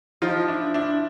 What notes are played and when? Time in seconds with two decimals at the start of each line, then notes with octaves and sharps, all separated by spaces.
0.22 F3 D#4 F4
0.48 D4 E4
0.74 D4 E4